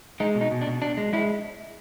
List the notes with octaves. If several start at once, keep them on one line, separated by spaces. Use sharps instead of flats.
G#3 D#4
B2
D#4
B2
D4
B2
B2 D4
G#3
G#3 E4